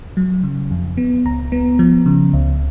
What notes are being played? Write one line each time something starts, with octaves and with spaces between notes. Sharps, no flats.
F#3
C#3
F2
B3
C#2 A#5
B3
F3
C#3
C#2